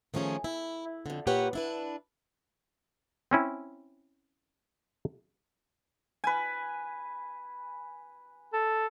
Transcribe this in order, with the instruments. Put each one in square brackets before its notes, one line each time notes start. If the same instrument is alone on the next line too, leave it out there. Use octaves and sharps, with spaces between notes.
[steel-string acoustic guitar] D#3 F3 A3 C#4 G#4
E4
F2 D3
A#2 G4 B4 C#5 F#5
D4 E4 B4
[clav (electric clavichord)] C4 C#4 E4
[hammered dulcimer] B4 G#5
[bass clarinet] A4